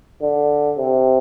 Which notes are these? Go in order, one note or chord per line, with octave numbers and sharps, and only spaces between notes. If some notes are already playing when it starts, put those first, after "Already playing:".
D3
C3